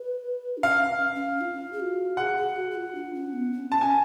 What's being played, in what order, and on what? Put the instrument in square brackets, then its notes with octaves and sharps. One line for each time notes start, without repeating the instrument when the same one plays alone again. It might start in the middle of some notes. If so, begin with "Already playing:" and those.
Already playing: [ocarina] B4
D4
[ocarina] C#4 [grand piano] F5
[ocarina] C#4
F4
G#4
F#4
[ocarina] G#4 [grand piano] F#5
[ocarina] G#4
F#4
F#4
F4
D4
C#4
B3
C#4
[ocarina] C#4 [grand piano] A5
[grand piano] G#5